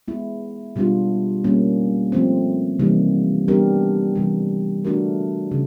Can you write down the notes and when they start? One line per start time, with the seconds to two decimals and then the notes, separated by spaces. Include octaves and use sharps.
0.08 G#3 B3 E4
0.76 B2 G3 B3 D4 F4
1.44 B2 G3 A#3 C#4
2.12 F3 A3 C4
2.79 C3 E3 G3 A#3 D#4
3.48 G3 B3 D4 G4 A#4
4.16 C3 E3 G3
4.85 A3 D4 F#4 A#4
5.51 C#3